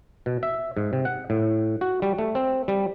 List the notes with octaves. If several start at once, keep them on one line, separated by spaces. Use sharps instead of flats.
B2
E5
G#2
C3
F#5
A2
F#4
G3
A3
C4
G3